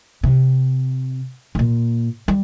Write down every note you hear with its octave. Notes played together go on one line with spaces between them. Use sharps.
C3
G2
A#2
G3